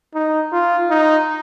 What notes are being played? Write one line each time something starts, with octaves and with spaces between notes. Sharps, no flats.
D#4
F4
D#4